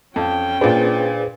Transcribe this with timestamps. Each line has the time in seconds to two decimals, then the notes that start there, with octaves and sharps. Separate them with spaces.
0.16 F2 C#4 G5
0.61 A#2 D4 G#4 B4 C5